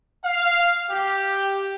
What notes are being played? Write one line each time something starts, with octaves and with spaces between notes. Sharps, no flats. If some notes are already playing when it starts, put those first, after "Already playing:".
F5
G4